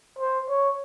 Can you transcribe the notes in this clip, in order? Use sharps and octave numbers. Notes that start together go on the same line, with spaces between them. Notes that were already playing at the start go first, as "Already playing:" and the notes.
C5
C#5